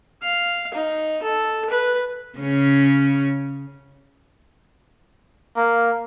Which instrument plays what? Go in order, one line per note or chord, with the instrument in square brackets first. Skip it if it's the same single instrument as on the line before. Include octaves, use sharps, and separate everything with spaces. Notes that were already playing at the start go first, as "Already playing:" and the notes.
[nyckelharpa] F5
D#4
A4
B4
[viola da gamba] C#3 C#4
[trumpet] A#3